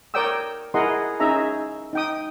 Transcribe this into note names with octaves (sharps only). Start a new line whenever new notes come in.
A#4 C#5 D5 G5 D#6 E6
E4 G#4 A#4 D#5 F#5 C6
C#4 D#4 G#4 E5 A#5
D#4 G5 D#6